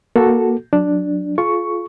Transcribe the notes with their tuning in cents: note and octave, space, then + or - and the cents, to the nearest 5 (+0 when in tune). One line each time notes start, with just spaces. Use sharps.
A#3 +20 F#4 +0 A4 +0
F#3 -15 D4 +0
F4 +0 G#4 +45 C#6 +5